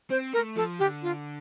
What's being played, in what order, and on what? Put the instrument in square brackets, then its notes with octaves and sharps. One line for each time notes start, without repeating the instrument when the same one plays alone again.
[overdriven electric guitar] C4 [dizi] C5
[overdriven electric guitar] A3 [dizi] A#4
[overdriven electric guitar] F3 [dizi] A4
[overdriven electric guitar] D3 [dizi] G4
[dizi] F4